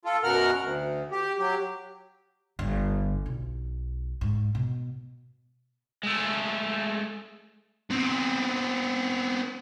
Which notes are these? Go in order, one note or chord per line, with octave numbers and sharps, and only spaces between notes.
F4 A4
F#2 B2 A#4 F#5 F6
D2
G4
F#3 G4
G1
B1
G#2
B2
G#3 A3
B3 C4